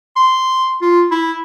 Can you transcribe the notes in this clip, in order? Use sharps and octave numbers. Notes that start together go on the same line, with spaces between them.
C6
F4
E4